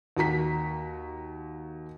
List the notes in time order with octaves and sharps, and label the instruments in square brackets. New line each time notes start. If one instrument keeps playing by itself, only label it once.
[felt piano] D#2 F#4 A#5 B6